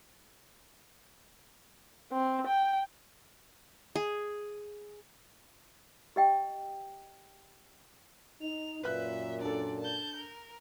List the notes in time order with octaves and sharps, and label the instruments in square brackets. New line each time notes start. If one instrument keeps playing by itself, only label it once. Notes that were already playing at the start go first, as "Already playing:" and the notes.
[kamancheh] C4
G5
[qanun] G#4
[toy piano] G4 D#5 G5
[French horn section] D#4 [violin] F7
[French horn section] F#2 A#2 [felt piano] B4 F#6 [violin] E5
[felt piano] D4 A4 [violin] D5
[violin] A5 G6
A#4